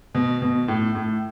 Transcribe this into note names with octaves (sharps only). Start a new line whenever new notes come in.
B2
B2
A2
A2